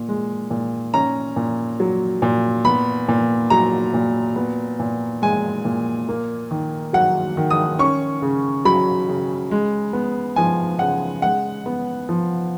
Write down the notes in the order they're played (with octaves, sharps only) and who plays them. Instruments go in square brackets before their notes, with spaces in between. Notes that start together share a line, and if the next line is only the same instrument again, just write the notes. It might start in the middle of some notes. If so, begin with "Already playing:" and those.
Already playing: [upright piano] A#2
G#3
A#2
C#4 A#5
A#2
F#3
A#2
B3 B5
A#2
F#3 A#5
A#2
B3
A#2
G#3 G#5
A#2
A#3
D#3
F#3 F#5
D#3
D#6
C#4 C#6
C#3
F#3 B5
C#3
G#3
B3
F3 G#5
C#3 F#5
G#3 F#5
B3
F3